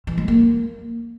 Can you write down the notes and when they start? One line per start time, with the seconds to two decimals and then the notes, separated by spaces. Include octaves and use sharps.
0.07 E3
0.18 G#3
0.28 A#3